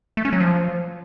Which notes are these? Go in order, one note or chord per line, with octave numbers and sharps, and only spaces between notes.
A3
C#4
F#3
F3